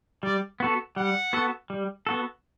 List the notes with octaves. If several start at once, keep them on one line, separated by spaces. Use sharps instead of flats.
G3 D5
B3 F#4 A4
G3 F#5
B3 F#4 A4
G3
B3 F#4 A4